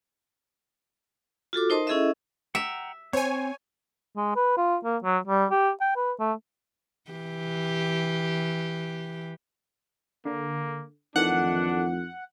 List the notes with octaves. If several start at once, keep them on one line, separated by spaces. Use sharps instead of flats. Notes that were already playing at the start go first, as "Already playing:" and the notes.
F4 F#4 A4 D6
D#4 A#4 C5 D#5 A5 C6
C#4 E4 G#4 A4 D#5 E5
E5 F#5 G5 A#5
C4 C5 C#5 G#5
G#3
B4
F4
A#3
F#3
G3
G4
G5
B4
A3
E3 G4
D3 A#3
F2 D#3 E3 A3 D4 F#5